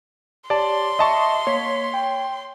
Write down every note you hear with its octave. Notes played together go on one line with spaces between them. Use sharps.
G4 C#5 D5 A5 C6
D#5 E5 A5 C#6
A#3 C#5 B6
G5